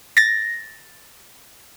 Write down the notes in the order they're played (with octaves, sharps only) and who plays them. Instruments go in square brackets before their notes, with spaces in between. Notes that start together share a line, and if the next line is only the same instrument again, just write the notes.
[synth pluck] A6 A#6